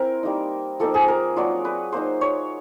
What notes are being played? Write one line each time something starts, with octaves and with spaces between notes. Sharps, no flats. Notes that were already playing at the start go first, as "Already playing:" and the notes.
Already playing: C4 E4 A#4
G3 A#3 D#4
F3 A#3 D#4 A4
G#4
A#4
F#3 A#3 D4 F4
B4
A#3 D#4 C5
C#5